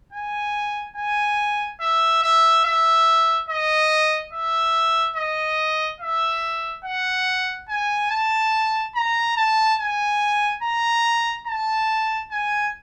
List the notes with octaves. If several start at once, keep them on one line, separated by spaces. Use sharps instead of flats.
G#5
G#5
E5
E5
E5
D#5
E5
D#5
E5
F#5
G#5
A5
A#5
A5
G#5
A#5
A5
G#5